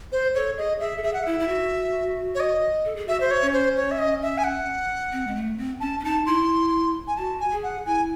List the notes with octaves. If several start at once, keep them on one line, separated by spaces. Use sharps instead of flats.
C5
A4 C#5
G#4 D#5
G#4 E5
A4
G#4 E5
F#5
E4 E5
E4
F#4
C#5
D#5
A4
G#4
F#4 E5
C5
C#5
C#4
C5
C#5
E5
D#5
E5
G#5
F#5
C4
G#3
A3
C4
C#4 A5
C#4
D#4 A5
E4 C6
G#5
F#4 A5
G#5
G#4
F#5
E4 G#5